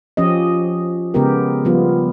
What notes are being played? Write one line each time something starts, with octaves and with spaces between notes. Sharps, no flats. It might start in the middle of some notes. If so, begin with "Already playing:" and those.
F3 C#4 G4 D#5
C#3 G#3 B3 G4 A#4
F3 G3 B3 F4